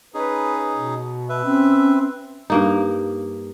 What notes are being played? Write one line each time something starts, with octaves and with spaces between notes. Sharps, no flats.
C#4 D#4 G#4 B4
B2
B4 E5
C4 C#4
G2 A#3 D#4